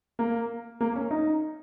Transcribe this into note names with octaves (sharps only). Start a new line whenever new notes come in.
A#3
A#3
C#4
D#4